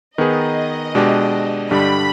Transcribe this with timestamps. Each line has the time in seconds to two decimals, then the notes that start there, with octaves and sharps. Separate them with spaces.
0.18 D#3 B3 D#4 G#4 B4 D#5
0.95 B2 G#3 D4 G4
1.71 G2 D3 G3 D4 G4 B5